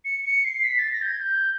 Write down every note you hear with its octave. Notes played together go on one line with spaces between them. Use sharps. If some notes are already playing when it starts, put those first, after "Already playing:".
C#7
C#7
C7
B6
A6
A#6
G6
G#6
G6